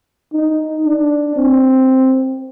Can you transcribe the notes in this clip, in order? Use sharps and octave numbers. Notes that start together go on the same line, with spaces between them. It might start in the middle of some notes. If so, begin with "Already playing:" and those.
D#4
D4
C4